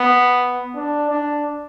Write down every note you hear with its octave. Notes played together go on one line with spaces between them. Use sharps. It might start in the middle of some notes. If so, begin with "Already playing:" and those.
Already playing: B3
D4
D4